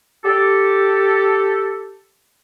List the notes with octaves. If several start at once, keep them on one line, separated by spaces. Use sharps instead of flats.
G4 A4